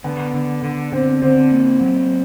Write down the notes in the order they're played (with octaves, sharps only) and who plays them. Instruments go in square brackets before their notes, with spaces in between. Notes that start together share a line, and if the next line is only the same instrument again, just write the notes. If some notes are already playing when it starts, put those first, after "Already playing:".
[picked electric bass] D3 [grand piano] B3
[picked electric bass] D3
D3
[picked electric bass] D3 [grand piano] C4
[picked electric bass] D3 [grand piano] C4
[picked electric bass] A#3
F#3